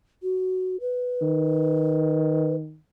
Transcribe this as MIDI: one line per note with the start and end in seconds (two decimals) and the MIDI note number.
0.23 0.77 66
0.80 2.56 71
1.22 2.77 51